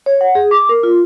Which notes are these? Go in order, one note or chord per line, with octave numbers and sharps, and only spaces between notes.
C#5
F#5
G#4
D6
A#4
F4